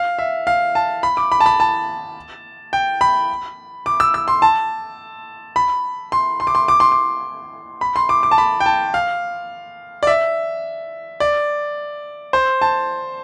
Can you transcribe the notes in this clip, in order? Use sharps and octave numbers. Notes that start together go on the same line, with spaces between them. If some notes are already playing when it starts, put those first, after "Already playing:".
Already playing: F5
E5
F5
A5
B5
D6
B5
A5
B5
A5
G5
B5
D6
E6
E6
C6
A5
B5
C6
C6
D6
C6
D6
C6
D6
B5
C6
D6
D6
A5
B5
G5
A5
F5
D5
E5
D5
C5
A5